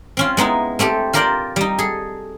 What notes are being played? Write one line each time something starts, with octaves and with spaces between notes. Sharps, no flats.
C4 C#4 F4
G#3 B3 D#4 E4
A3 C4 G4 A4
F4 G4 A#4 C5 D5 G5
G3 D#4
G#4 A4